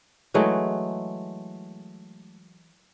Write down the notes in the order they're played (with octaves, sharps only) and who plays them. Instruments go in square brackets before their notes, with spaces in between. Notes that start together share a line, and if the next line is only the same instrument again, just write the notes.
[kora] E3 F#3 G#3 A3